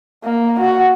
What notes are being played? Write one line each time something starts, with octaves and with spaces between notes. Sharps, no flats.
A#3
F#4